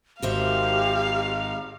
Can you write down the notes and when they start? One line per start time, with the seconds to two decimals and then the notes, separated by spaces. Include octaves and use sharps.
0.22 G#1 F#4 G4 C5 E5 F5